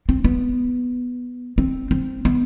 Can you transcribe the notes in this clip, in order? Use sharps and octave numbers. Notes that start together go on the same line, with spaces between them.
C4
B3
C4
C4
B3